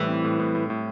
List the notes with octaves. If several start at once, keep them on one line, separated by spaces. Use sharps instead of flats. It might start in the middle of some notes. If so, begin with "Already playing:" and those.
Already playing: A2 E3 G3
C4
A2
A2
A2
A2